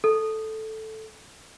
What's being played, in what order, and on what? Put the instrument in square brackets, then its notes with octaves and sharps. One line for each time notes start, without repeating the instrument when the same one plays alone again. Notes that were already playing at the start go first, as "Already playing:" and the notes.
[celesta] A4